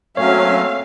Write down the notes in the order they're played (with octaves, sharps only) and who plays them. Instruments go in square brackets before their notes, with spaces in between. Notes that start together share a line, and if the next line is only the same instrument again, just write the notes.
[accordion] F#3 C#4 [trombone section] A3 A#3 C4 [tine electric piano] C#5 [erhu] F5